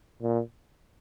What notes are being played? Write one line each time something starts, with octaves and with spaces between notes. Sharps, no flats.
A#2